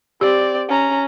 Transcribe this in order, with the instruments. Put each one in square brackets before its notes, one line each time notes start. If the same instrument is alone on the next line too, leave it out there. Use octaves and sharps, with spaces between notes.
[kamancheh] C4 D5 [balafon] G4
[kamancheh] C#4 A#5